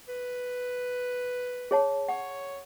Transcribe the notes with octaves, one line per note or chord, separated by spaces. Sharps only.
B4
G#4 C#5 A5
C#5 F#5